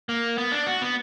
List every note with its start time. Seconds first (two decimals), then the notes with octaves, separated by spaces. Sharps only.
0.09 A#3
0.38 B3
0.52 D4
0.67 F#4
0.82 B3